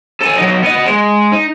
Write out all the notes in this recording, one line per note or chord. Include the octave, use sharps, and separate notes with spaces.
A4 G#5
F#3 D#4
B3 D#5
G#3
D#4